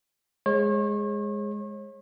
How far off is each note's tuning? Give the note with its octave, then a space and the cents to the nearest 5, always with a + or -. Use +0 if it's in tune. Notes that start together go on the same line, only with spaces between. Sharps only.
G#3 -5 C#5 -40